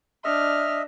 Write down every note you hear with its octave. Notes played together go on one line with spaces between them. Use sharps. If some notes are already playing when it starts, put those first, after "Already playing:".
D4 D#5 E5 F6